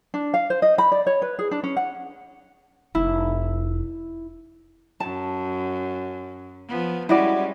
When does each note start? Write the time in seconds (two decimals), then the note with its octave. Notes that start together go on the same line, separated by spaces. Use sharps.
0.14 D4
0.34 F5
0.50 C5
0.62 D#5
0.78 B5
0.92 D5
1.07 C#5
1.22 B4
1.39 G#4
1.51 D4
1.64 C#4
1.76 F#5
2.95 F1 E4
5.00 F#2 A5
6.68 F3 B3
7.09 G3 G#3 C#4 E4 F#4 D5